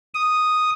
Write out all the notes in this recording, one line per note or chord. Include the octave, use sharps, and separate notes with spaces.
D#6